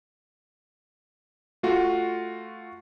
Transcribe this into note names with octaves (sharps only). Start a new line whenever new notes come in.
A3 F4 F#4